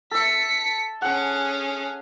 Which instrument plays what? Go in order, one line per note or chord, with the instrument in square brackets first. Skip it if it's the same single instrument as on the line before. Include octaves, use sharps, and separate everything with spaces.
[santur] A4 E5 [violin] B6 C#7
[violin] C#4 G#4 [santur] F#5